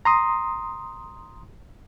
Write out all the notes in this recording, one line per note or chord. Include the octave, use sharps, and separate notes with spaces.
A#5 C6 D#6